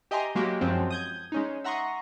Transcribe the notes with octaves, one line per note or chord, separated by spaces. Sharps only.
G4 D#5 E5 G#5 A#5 C6
F#3 G#3 A#3 F#4 G4
F#2 F3 F#3 G#3 C4
D#6 G6 G#6
G#3 C#4 D#4
E5 F#5 A#5 C6 C#6 D#6